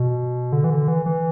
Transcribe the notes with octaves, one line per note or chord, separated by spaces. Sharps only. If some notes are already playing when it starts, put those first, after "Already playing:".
Already playing: B2
D3
E3
D3
E3
E3